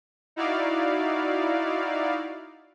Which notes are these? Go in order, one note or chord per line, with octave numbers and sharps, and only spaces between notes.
D#4 E4 F#4 D5 F5